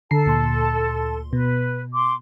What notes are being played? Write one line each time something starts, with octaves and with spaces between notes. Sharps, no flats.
D3 A4 A5 A#5 C7
D2 A#2 C6
B2 B4
C6 D6